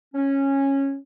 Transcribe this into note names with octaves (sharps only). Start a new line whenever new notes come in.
C#4